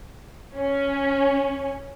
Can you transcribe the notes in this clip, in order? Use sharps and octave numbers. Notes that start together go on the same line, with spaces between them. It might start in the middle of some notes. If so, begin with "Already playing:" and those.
C#4